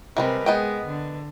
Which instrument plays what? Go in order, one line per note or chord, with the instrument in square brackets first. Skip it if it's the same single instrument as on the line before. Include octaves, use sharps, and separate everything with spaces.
[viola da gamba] C3 A#4 B4 [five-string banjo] E3 G3 G#3
[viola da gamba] G#3 [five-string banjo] B3 D#5 G5
[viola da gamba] D3